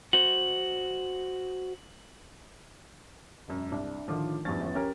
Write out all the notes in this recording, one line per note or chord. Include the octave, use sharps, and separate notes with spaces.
F#4 C5 F#7
E1 F#2
C2 D4
A2 D3 D#3 F3 F4 D6
E2 G2 F3 C#4 A6
G1 E2
C#4 G4 A#4